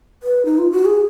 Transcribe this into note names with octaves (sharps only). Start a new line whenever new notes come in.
B4
D#4
F4
F#4
G#4